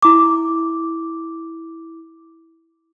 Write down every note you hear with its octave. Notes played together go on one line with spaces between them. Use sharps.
E4 D6